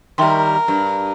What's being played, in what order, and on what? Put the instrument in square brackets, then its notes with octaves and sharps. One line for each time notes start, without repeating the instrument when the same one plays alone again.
[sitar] D#3 G3 [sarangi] A#4 [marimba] E5 G5 C6
[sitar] G2